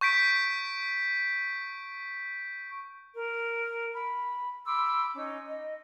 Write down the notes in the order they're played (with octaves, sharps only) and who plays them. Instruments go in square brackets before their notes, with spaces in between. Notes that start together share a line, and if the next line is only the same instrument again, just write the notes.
[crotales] C#6 G6 B6 D7
[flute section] A#4
B5
B5 C6 D6 E6
C#4 D#4
D#5